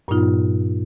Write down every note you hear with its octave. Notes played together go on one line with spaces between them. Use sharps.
G2 A#2 F#3 B3 D#4 F4